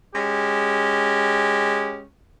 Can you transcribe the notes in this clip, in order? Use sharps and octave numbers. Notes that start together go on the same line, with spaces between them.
G#3 C#4 G4